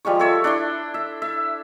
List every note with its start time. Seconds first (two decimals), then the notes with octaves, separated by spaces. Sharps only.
0.05 F3 G3 G#3 C#6
0.19 A4 C#5 E5
0.44 D4 E4 C6
0.94 E5
1.22 E5